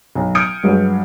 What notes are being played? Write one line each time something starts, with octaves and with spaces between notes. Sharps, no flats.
B1
D#6 F6 G6 G#6 C#7 D7
G2 F#3 G#3